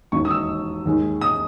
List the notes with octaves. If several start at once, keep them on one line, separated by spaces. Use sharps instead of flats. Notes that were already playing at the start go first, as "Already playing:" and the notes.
E1 D#2 D#3 C#6
D#6
E6
D#2 D#3 G#3
D#6